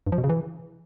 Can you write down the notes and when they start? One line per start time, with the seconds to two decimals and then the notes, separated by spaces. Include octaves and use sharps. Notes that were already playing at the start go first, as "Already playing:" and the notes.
0.07 G2
0.12 F3
0.18 B2
0.24 C#3
0.29 E3